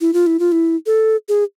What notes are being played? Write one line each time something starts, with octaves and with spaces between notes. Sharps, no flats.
E4
F4
E4
F4
E4
A4
G#4